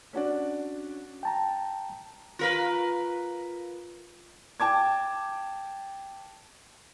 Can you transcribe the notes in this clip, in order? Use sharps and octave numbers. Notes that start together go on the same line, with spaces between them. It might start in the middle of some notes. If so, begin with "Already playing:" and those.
C#4 D4 F#4 D5
G5 A5 A#5
F4 A#4 B4
G5 A5 D6 G#6